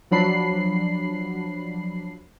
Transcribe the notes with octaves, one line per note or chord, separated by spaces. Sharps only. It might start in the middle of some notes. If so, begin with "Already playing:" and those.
F3 F#3 D4 B5 C7